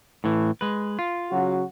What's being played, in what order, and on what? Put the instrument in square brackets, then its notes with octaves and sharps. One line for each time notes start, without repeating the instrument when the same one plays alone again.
[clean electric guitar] A2 E3
G#3 B4
F4
[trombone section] C#3 F#3 F#4